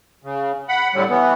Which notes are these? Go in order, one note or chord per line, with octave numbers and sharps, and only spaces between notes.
C#3
F#5 B5
A2 D3 F#3 G3
E3 B3